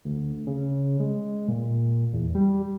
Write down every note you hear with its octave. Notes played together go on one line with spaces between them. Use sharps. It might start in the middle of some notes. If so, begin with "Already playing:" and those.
D2
C#3
G#3
A#2
E2
G3